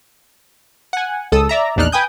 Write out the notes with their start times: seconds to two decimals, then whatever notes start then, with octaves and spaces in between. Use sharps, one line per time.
0.93 F#5 G#5
1.32 C#2 A4 D#6 E6
1.49 D5 E5 A#5
1.76 A#1 E2 D4 D#4 F6 F#6
1.92 B4 G5 G#5 D#6 G6